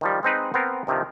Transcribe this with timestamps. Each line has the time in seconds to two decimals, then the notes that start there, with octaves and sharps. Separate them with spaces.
0.01 D#3 F3 G3
0.23 G#3 C4 D#4 B4
0.54 B3 C4 A#4
0.87 G2 C3 D#3 F3